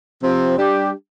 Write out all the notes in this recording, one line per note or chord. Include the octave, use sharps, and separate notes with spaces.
C3 F3 C4
G3 D4 G4